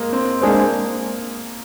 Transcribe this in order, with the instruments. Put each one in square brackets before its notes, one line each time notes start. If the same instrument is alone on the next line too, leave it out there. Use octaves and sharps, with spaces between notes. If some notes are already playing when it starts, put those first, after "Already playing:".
Already playing: [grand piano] G#3 A#3
C4
[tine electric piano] G#3 D4 G#4 C5 [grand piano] A#3